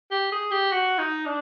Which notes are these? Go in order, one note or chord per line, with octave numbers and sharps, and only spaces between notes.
G4
G#4
G4
F#4
D#4
D4